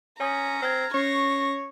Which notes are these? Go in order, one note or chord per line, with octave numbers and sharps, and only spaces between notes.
C#4 C#5 G#5 A#5 D#6
C4 F6 G#6
C#4 C#5 C#6 A#6 C7